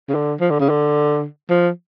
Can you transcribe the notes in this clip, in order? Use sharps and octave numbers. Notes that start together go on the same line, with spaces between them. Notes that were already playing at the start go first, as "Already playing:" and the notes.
C#3
D3
F3
D3
C#3
D3
F3